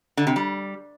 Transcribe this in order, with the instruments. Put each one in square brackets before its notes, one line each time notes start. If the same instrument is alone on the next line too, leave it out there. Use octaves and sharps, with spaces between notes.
[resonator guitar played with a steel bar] D3
C3
G3